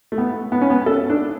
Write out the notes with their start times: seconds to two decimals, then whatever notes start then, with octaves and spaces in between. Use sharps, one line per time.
0.12 A3
0.18 B3
0.52 B3
0.61 C#4
0.70 B3
0.86 A4
1.10 D4